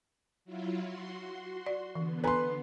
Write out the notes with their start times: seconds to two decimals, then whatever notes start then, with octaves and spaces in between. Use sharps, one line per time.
0.45 F#3 E4 F4
0.82 F#4 C6
1.66 D5
1.95 D3 E3 B3
2.24 A4 B4 G#5 A#5 C6